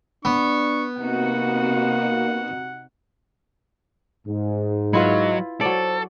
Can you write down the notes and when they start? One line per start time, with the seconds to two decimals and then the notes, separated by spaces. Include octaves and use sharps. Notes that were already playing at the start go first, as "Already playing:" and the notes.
0.25 B3 D4 C#6
0.97 C3 A#3 D#4 F#4 F#5
4.27 G#2
4.93 F#3 E4 F4 B4 D#5
5.61 F#3 A4 C5 D5